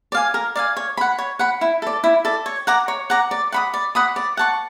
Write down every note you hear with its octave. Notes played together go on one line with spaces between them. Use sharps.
D5 F5 G#5
A#4
D5 F5 G#5
C#5
F#5 B5
C#5
F#5 B5
E4
A4 D5
E4
A4 D5
C#5
F#5 A#5 D6
C#5
F#5 A#5 D6
D5
F#5 B5 D#6
D5
F#5 B5 D#6
D5
F#5 A5 C#6